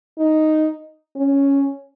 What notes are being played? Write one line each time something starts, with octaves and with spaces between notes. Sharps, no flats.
D#4
C#4